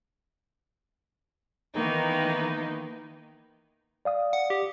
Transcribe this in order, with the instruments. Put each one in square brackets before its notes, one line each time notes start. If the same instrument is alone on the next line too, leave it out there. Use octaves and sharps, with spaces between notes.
[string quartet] D#3 E3 A#3 B3 D#4
[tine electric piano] D5 F5 D#6
[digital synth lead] F#5
G4